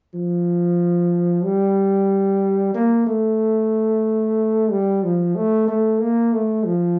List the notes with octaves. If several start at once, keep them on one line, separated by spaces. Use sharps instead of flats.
F3
G3
A#3
A3
G3
F3
A3
A3
A#3
A3
F3